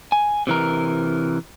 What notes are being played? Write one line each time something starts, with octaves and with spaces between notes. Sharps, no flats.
G#5
C3 E3 A#4